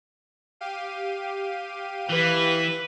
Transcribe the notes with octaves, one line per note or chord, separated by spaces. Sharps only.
G4 F5 D#7
E3 B4